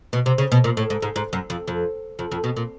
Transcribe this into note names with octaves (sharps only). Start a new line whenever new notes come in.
B2
C3
C#3
B2
A#2
A2
G#2
G#2
G#2
F#2
F2
F2
F2
F2
B2
A#2